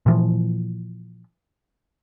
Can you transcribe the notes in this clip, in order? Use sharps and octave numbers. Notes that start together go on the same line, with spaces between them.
A#2 E3 F3